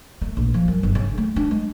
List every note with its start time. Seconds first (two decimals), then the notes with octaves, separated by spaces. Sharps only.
0.22 A3
0.37 A#1
0.54 F3
0.68 F#2
0.83 G1
0.95 C#3
1.18 A3
1.36 D4
1.51 G#3